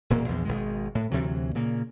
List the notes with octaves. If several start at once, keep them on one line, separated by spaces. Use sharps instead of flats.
E1 A#2 A#3
A#1 E2
G#1 B2 G#3
A2
D2 C3 E3 F#3
A#2 C#3 A#3